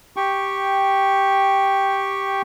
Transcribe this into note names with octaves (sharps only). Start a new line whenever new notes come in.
G4 G5 C#6